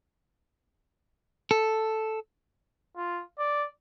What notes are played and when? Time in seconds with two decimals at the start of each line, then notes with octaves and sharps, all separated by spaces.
1.51 A4
2.97 F4
3.38 D5